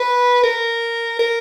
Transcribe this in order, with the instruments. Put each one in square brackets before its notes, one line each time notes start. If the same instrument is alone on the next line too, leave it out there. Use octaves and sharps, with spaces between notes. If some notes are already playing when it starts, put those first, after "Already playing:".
Already playing: [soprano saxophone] B4
A#4
A#4